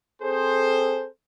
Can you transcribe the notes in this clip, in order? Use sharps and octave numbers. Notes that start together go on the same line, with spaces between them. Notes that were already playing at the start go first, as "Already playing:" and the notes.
C4 G#4 A4 C5